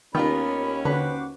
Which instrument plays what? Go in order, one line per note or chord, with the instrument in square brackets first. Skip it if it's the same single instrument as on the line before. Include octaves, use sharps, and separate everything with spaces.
[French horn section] D#2 C#4 [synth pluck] D#3 [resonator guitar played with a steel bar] B3 F4 A#4 [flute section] B5
[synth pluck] D3 [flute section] F#4 C5 D6 [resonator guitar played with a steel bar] B4